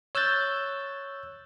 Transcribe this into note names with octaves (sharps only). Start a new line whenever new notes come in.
C#5 E6 F#6 G6 A6